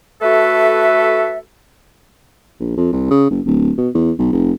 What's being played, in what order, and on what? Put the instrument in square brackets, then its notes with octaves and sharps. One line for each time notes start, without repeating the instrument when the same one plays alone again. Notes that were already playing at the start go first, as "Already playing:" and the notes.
[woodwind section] A3 F#4 A4 B4 E5
[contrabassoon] A#1
F2
C2
C#3
F#1
D1
B2
E2
B1
F1